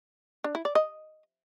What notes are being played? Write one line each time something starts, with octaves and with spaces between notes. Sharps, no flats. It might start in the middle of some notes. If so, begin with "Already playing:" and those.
D4
E4
D5
D#5